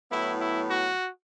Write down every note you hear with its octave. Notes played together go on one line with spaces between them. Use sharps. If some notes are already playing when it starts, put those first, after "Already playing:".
A2 F#3 B3 E4
E4
F#4